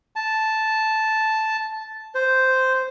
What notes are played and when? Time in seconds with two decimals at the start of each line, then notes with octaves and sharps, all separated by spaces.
0.16 A5
2.15 C5